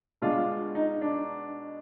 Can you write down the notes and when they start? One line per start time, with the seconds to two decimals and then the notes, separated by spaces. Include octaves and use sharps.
0.22 B2 G#3 D4 F4
0.75 D#4
1.01 D4